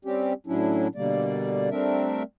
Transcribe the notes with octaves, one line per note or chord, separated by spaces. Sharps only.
G3 C4 C#4 G4
A2 F#3 C#4 D4 E4
B2 D3 G3 A#3 D5
G3 A3 C4 D4 A#4 E5